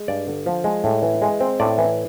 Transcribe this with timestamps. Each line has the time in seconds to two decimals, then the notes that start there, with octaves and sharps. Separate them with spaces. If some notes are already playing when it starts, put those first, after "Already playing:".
Already playing: G#3
0.08 G2 D5
0.27 D3
0.46 F3
0.64 G#3
0.84 A2
1.02 E3
1.22 G#3
1.40 C4
1.60 A2 D5
1.78 E3